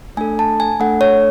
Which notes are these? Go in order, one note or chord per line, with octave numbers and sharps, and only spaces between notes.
A3 D4 A4 G#5
A5
G#5
A3 D4 A4 F#5
C#5